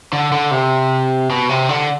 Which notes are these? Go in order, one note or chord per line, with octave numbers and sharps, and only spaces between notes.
D3
D3
C3
B2
C3
D3